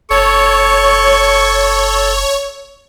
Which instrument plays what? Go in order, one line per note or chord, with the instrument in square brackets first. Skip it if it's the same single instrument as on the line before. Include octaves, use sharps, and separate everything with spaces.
[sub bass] F#1 [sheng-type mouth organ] A4 [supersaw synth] C#5 [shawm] C#6